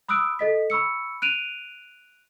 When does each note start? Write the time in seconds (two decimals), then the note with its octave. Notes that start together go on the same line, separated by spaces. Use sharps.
0.09 B5 D#6 E6 F#6 D7
0.39 A4 D#5 B6
0.70 B5 C#6 E6 C#7
1.22 F#6 D7 D#7 F7